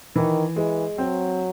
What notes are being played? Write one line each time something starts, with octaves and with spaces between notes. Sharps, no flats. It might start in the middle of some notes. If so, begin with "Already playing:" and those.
D#3 E3
E3 G#3
F#3 C4